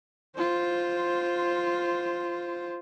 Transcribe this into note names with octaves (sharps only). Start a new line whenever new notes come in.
F4 C5